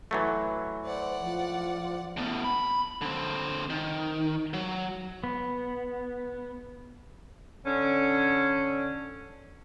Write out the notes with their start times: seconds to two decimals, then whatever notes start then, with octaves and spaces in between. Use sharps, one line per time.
0.11 E3 F#3 A3
0.85 C5 D5 F#5
1.20 F3
2.17 A2 B3
2.44 B5
3.01 D3 C4
3.70 D#3
4.53 F#3
5.24 B3
7.66 D3 C#4